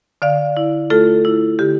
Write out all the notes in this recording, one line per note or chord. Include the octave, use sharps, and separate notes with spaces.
D3 D5 F5
E4
A3 F4 A4
E4
D3 G4